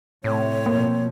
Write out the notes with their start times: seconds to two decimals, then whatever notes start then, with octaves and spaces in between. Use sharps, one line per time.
0.24 A2 C3 A3 C4 C#5
0.66 B2 F3 A#3